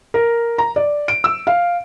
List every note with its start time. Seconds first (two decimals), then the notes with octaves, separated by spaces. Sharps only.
0.14 A#4
0.58 A#5
0.76 D5
1.08 D7
1.24 E6
1.47 F5